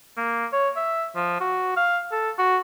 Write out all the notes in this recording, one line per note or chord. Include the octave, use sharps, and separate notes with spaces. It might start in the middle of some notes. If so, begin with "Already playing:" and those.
A#3
C#5
E5
F3
F#4
F5
A4
F#4